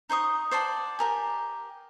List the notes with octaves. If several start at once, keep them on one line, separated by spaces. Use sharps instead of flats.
D#4 C5 C#6 D#6
C5 D5 F#5 A5
G4 A#4 G#5